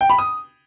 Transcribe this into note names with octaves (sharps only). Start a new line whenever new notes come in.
G5
B5
D#6